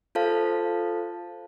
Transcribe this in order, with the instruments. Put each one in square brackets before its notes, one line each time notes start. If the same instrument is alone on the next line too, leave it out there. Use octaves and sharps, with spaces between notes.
[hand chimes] F4 A4 C5 F5 A5